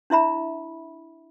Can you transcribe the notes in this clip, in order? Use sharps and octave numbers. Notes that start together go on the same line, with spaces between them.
D4 E4 E5 B5